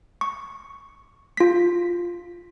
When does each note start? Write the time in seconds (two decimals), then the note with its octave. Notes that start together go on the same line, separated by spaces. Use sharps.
0.21 C#6
1.37 F4 B6